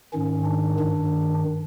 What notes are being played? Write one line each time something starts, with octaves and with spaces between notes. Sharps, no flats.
G#2 D#3 C#4
D4
G2 D#3